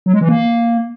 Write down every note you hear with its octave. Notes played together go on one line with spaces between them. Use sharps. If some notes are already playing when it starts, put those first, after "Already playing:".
F#3
G#3
E3
A#3